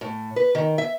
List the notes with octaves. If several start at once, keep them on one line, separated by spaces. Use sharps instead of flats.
A2
B4
D#3
E5